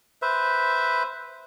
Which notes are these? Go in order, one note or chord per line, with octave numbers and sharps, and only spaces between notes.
B4 C5 E5